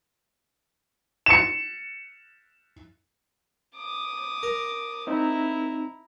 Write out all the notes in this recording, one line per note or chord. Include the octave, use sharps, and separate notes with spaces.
C#7 E7
D6 D#6
A#4
C4 D#4 E4 A#5